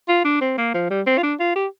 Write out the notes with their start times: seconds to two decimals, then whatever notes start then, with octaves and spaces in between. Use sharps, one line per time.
0.09 F4
0.25 D4
0.41 C4
0.58 A#3
0.74 F3
0.90 G3
1.07 C4
1.18 F4
1.23 D4
1.40 F4
1.56 G4